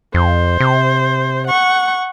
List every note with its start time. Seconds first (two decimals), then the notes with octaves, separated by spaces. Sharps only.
0.14 F2 C5
0.60 C3
1.48 F#5 C#6